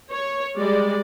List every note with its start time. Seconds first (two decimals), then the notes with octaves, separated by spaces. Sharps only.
0.13 C#5
0.56 G3 G#3 D5